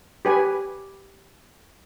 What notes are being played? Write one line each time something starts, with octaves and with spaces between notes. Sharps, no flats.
G4 B4 G#5